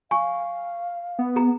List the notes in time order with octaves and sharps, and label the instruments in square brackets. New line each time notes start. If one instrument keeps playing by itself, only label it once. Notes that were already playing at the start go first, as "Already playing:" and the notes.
[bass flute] F5 [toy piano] G#5 C#6
[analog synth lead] B3
[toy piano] G#4 A#5